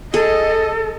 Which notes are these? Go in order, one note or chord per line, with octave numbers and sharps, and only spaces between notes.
G#4 A4 D#5